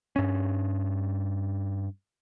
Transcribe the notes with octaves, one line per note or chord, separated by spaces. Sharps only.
G2 C#4